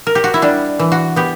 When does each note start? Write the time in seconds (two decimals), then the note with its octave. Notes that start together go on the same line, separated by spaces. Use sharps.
0.07 A#4
0.15 G4
0.24 F#4
0.34 E4
0.42 G3 D4
0.79 E3
0.92 F#4
1.16 B3 G4